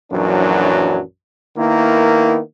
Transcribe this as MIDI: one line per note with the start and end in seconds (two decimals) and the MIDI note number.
0.12 1.00 34
0.12 1.00 42
0.12 1.00 52
0.12 1.00 54
0.12 1.00 62
1.57 2.38 51
1.57 2.38 58
1.57 2.38 59
1.57 2.38 64